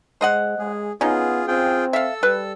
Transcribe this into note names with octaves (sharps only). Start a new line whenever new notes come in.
G#3 C5 D#5 F#5
G#3 G#4
B3 C#4 D#4 F4 G#4
C4 F4 G#4 G5
A4 E5 F5 E6
G3 B4